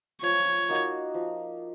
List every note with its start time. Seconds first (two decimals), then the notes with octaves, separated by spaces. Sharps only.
0.22 F3 C#5
0.69 A#3 D#4 F#4
1.14 F3